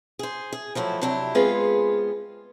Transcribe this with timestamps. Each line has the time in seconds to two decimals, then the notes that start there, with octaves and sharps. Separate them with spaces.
0.19 G#4 C5
0.53 G#4
0.75 F3 F#3 A3 E4 G4
1.02 C3 F#3 D4 E4 G4
1.35 G#3 B3 C4 F4 G#4 B4